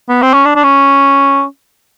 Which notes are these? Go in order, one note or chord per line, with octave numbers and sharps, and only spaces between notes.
B3
C4
C#4
D4
D4
C#4